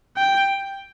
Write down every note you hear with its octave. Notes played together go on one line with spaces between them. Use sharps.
G5